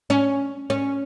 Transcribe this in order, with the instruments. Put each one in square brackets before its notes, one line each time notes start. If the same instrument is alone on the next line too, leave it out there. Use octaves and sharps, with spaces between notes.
[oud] C#4
C#4